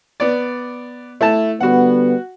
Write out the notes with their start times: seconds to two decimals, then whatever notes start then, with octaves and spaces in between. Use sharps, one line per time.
0.20 B3 D5
1.21 A3 E4 A5
1.60 D3 G3 B3 F#4 F#5